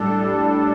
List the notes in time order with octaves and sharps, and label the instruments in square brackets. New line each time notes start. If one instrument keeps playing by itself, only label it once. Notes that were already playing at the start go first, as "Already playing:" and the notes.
Already playing: [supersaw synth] A2 G3 D4 A4